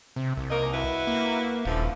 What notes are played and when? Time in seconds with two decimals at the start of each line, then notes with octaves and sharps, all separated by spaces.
0.16 C3
0.37 C2
0.50 A#3 D#4 A#4
0.73 E4 F#4 B4
1.07 A#3
1.65 D#1 D3 E3 F3